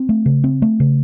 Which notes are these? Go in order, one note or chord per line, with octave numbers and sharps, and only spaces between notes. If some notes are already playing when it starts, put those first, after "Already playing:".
Already playing: C4
A3
C#3
C4
A3
C#3